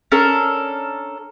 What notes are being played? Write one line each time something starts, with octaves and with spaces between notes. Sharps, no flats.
C#4 D4 A4 A#4